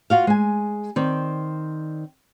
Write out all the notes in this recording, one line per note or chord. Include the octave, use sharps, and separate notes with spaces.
F4 F#4 F5
G#3 G#5
D#3 C4 D5